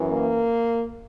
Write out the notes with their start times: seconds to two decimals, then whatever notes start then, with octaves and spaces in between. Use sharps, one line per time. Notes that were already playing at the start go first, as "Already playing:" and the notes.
Already playing: F#2 E3
0.10 A#3